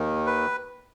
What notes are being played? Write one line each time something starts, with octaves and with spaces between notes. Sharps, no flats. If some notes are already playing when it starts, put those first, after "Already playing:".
Already playing: D#2 D#3
B4